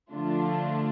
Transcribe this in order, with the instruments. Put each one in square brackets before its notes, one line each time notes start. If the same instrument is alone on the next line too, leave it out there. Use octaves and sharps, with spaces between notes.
[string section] D3 F3 A3 D4 F4